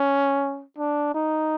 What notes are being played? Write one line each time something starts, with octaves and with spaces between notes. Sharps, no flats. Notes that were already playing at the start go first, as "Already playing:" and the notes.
Already playing: C#4
D4
D#4